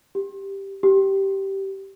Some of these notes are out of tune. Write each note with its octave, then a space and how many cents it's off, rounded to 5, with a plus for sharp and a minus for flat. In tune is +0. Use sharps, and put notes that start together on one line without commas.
G4 +0
G4 -15